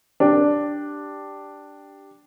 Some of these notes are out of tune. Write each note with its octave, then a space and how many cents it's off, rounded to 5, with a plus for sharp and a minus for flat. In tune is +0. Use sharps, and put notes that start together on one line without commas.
D4 +0 G4 +0